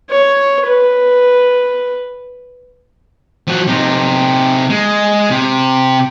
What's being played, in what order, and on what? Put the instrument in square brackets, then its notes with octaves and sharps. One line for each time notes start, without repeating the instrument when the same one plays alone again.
[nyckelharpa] C#5
B4
[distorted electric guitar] F3 F#4
C3 D#4
G#3
C3